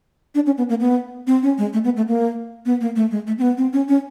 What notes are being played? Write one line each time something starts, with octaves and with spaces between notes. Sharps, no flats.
D4
C#4
B3
A#3
B3
C4
C#4
G#3
A3
B3
A3
A#3
B3
A#3
A3
G#3
A3
C4
B3
C4
C#4
C#4